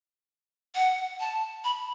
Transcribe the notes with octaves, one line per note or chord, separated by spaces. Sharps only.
F#5
A5
B5